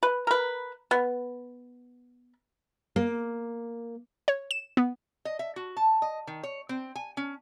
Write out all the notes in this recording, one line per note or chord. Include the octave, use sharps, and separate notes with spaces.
B4
A#4 B4
B3
A#3
C#5
E7
B3
D#5
E5
F#4
A5
D#5
D#3
C#5
C4
G#5
C#4